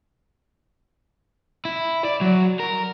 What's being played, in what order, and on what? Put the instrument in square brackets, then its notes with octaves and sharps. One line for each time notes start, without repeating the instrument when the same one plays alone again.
[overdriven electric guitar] E4
D5
F#3
A#4